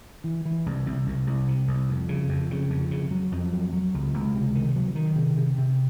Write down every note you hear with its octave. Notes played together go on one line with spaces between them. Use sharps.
E3
E3
C2
C2
C2
C2
C3
C2
F2
C#3
F2
C#3
F2
C#3
F#3
F2
F#3
F#3
C#2
C#2
C3
D#3
F#3
D#3
C3
C3
C3